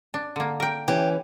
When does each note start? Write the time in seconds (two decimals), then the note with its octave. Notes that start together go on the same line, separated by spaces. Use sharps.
0.14 D4
0.36 D3 A#3
0.60 A#4 G5
0.88 E3 C#4 G4